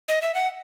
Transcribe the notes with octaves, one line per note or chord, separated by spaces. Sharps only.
D#5
E5
F#5